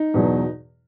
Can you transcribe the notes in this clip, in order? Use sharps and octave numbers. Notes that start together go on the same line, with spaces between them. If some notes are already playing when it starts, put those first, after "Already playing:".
Already playing: D#4
E2 B2 F#3